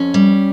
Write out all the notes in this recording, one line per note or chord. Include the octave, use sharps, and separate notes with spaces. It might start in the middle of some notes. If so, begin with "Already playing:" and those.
Already playing: F2 C#4
G3